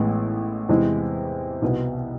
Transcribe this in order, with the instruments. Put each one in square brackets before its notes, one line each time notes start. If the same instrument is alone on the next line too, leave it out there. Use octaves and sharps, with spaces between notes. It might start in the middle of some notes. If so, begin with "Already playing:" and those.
Already playing: [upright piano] A1 A2 G#3 B3 E4
E2 C3 G#3 C4 E4
C2 B2 B3